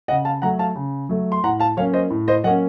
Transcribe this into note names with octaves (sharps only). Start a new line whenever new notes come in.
C#3 D#5 F#5
F5 A5
F#3 A3 F#5 A#5
F5 A5
C#3
F#3 A3
C6
A2 F#5 A#5
F5 A5
F#3 A#3 C#4 C#5 F5
C5 D#5
A2
C5 D#5
F#3 A#3 C#4 D#5 F#5